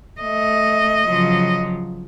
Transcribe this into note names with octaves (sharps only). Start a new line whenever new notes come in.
A3 D#5
C#3 F3 F#3